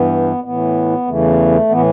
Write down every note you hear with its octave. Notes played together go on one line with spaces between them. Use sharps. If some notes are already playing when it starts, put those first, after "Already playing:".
Already playing: G2 E3 B3
A2 E3 B3
E2 C#3 E3 A3
A2 E3 B3